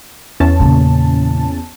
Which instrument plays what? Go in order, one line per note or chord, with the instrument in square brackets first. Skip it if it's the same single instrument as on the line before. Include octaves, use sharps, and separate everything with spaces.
[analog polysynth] E2 C#4 A5
[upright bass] A#2 C#3